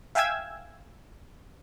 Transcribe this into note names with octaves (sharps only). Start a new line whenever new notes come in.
E5 F5 G5 G#5 E6 G#6